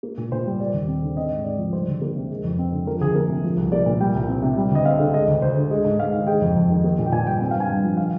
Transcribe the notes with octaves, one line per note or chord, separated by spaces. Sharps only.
A#3
A#2
A#2 C5
G3
G3 D5
D#2
C4
D3
C4 D#5
G#2
G#2 D5
F3
G3 C5
D2
A#3
C3
G#3
F2
C4
D3
F3 A#4
D2 G#4
A#3 A#4
C3
F3
C2
A#3 D5
A#2
G3 G5
C2
C4
C3
G3
D2 D#5
C4 F5
D3
G#3 D#5
D2
D2 C5
D3
G#3
G#2
G#2 F5
D#3
G#3 G5
F2
F2
D#3
A#3
A#2
G5
A#2 G#5
G3 G5
C4 G5
F5
G2
G#5
G2 G5
F3
D#3 F5